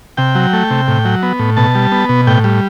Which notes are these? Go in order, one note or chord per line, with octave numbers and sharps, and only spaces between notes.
C3 G5
F#3
A3
C3
A2
F#3
B3
A2
B2 A5
G3
B3
B2
A2 G5
G3